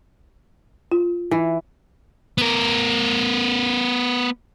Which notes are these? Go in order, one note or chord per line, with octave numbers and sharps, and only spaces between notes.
F4
E3
B3 A#4